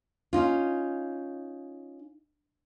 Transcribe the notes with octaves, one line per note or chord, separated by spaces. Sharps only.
C#4 D#4 F4